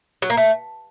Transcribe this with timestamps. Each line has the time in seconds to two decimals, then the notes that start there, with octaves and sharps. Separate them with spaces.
0.22 F#3
0.30 A#3
0.37 A3